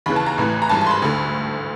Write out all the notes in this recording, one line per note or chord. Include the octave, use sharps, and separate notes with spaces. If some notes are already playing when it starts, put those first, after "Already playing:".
D#2 C#3 E3 B5
A5
A#5
A1 A2 E3
A#5
G#1 G2 E3 A5
A5
C6
B5
D2 D3